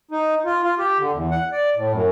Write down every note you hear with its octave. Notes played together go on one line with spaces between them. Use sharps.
D#4
F4
F4
G4
D3
E2
F#5
D5
A2
F#2